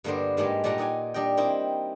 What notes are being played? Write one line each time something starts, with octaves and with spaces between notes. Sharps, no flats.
G2 D3 A#3 B3 D4 C5
G#2 G3 G#3 A#3 G4 A5
A#2 G3 A4 D5 F#5 A#5
D#4 D5 F#5 G#5
G3 D4 D#5 G5
A#3 C4 D#4 E4